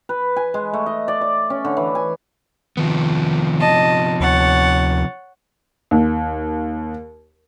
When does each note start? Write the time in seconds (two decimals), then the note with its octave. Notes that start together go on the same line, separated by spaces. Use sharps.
0.09 B4
0.37 G#5
0.54 G#3
0.73 A3
0.86 D#5
1.08 D5
1.21 D5
1.50 C#4
1.65 D3
1.77 E3
1.95 G#5
2.77 C3 D#3 F3 B3
3.59 D#5 A5
4.20 D2 C#5 F#5 A6
5.91 D#2